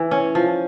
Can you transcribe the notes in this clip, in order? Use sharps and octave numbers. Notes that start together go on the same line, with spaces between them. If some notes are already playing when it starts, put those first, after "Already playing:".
Already playing: E3
C#4
F3